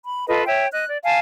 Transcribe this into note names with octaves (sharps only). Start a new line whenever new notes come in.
B5
F4 A4 B4 D#5
C#5 E5 G5
D#5 F#6
D5
F5 G#5 A5